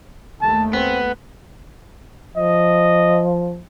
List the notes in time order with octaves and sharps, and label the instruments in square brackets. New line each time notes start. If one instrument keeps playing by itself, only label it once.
[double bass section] D#2 A3 [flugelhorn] A5
[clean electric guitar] B3 [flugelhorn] C4
[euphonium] F3 [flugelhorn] D#5